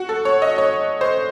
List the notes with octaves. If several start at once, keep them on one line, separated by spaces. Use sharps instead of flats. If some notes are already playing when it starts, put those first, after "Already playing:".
Already playing: F#4
A4
C#5
D#5
C#5
C5